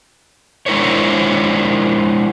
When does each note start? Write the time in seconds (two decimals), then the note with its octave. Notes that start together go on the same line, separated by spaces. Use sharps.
0.66 G#3 D4 E4 A#4 C5 C#5